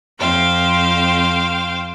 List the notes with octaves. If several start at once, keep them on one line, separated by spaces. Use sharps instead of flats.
F2 C5 F5 G5